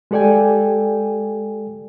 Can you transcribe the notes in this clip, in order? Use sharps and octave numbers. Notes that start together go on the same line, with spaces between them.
G#3 G4 A4 D5 G5 G#5